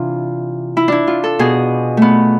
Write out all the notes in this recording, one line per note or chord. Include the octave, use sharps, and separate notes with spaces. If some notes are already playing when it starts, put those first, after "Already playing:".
Already playing: C3 E3 D4 F4
E4
D4 E4
F4
A4
B2 G#4
A3 B3